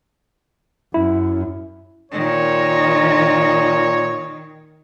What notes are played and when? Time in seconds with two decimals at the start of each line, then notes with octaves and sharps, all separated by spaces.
0.94 F#2 E4
2.12 A#2 D#3 C#5